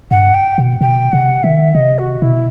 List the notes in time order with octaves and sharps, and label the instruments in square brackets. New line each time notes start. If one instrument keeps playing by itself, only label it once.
[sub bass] G2 [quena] F#5
[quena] G5
[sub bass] B2
[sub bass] B2 [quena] G5
[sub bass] C3 [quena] F#5
[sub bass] D#3 [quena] E5
[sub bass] C3 [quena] D#5
[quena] F#4
[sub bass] B2 [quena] E4